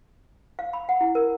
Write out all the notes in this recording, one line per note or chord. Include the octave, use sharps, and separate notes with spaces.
F5
B5
F#5
E4
A#4